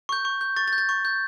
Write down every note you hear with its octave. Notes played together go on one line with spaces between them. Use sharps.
C#6 G6
C#6
G6
C#6 A6
A6
G6
A6
C#6
G6